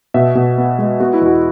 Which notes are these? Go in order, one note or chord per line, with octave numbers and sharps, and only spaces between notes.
B2 E5
B2
B3
G#3
B3 F#4
E4
E2 F#4